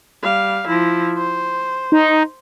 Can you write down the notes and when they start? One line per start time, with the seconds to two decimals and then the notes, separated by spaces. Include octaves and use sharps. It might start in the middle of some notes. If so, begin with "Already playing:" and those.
0.23 G3 F5
0.68 F3 E4
1.17 C5
1.92 D#4